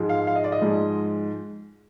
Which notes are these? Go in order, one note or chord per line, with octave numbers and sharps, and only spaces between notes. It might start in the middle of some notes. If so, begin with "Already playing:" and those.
Already playing: G#2 F3 G#3
F5
F5
D#5
D5
D#5
G#2 F3 G#3